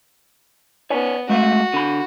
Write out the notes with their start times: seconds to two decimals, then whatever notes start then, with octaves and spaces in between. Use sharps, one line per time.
0.90 B3 C#5 D5 G#5
1.29 G#3 A3 F#4 F5
1.74 D3 B5